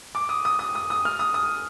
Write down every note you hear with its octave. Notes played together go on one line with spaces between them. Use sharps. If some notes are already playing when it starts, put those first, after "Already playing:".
D6
D#6
D#6
D#6
D#6
D#6
F6
D#6
D#6